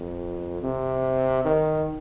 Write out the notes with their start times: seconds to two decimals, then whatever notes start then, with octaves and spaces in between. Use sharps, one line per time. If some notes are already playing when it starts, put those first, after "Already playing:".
Already playing: F2
0.63 C3
1.45 D#3